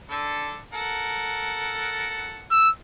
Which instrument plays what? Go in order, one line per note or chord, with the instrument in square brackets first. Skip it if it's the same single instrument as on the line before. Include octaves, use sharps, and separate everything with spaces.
[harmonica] D3 A4
A4 A#4 F#5
[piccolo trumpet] E6